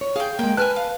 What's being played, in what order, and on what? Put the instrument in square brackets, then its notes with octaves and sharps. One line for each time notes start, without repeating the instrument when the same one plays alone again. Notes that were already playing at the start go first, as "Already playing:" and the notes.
[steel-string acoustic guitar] C#5
[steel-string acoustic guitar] G#4 [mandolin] F5 G5
[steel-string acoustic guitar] G#3 A#3 [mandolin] G5
[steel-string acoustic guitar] B4 A5 [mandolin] G#5 F6 F#6
[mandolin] F5